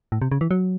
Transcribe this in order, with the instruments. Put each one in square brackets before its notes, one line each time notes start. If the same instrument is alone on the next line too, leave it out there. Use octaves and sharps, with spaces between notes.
[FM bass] A2
C3
C#3
E3
F#3